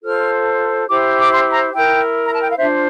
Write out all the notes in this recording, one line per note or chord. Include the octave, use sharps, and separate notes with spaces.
F4 A4 C5 F6
E4 G4 C5 D6
D6
C6
A#5
E4 A#4 G5
A#5
A5
G5
F5
D4 F4 C5 E5